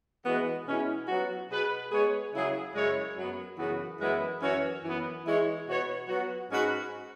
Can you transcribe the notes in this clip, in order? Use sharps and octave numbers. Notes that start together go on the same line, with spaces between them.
E3 G#3 B3 F#4
B2 G#3 C#4 E4
F#3 B3 F#4
B2 B3 G#4 B4
G#3 B3 G#4 C#5
C#3 F#3 E4 G#4
F#2 C#3 G#3 E4 C#5
F#2 F#3 B3
F#2 C#3 E3 B3 F#4
F#2 E3 G#3 B3 E4
F#2 E3 C#4 F#4 C#5
F#2 E3 B3
E3 G#3 E4 C#5
B2 B3 F#4 C#5
F#3 B3 F#4
G#2 G#3 C#4 F#4 B4